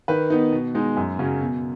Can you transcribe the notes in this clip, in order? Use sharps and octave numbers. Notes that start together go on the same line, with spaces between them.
D#3 B4
B3 D#4
B2
G#3 B3 D#4
F#2
C#3 F#3 C#4
B2